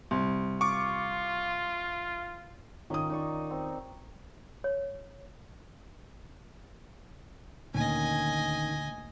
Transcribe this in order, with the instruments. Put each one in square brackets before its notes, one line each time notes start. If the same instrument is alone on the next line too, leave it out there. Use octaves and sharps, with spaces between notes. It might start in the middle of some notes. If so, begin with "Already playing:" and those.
[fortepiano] C2
[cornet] F4 [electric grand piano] C#6 D6
[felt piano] D#3 F4 D#6 [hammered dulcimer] C#4 A#4 D#5
[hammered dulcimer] D#4 D5 C#6
C4
[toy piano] C#5
[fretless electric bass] D2 [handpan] A#2 A#3 [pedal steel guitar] D#3 C#4 [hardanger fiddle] D#5 G#5